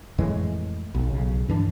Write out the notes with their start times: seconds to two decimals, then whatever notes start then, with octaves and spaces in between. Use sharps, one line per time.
0.18 F2 A2 E3 G#3
0.95 B1
1.10 B1 C#3
1.48 G2 E3 D4